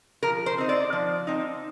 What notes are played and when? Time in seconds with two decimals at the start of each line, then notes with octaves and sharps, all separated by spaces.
0.23 F3 A#4
0.46 C5
0.58 C4 D#4
0.69 D5
0.93 F3
1.27 C4 D#4